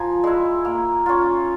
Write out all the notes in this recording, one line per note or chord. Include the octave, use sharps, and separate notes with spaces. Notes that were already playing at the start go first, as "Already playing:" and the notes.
Already playing: F3 G#5 A#5
G#3 E4
A#3
C#4 F4